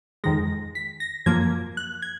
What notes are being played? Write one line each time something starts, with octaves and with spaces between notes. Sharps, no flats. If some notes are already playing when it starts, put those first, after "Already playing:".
F2 D#3 G#3 A#6
B6
A#6
F#2 F3 A#3 G#6
F#6
G#6